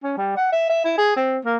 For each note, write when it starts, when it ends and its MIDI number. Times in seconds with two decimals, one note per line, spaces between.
0.04 0.17 61
0.17 0.34 55
0.37 0.49 78
0.52 0.65 76
0.69 0.81 76
0.85 0.95 64
0.98 1.14 68
1.16 1.38 60
1.45 1.58 58